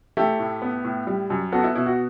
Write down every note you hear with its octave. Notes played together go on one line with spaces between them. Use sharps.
A3 E4 G4
A2
B3
A2
G3
F#2
B3 F#4 A4
E4
B2 E4
F#4